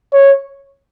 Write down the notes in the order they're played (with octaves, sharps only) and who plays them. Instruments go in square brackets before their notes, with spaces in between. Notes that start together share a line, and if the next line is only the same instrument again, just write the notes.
[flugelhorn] C#5